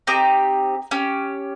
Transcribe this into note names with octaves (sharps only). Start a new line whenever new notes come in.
C4 D#4 G4 A#5
C#4 G4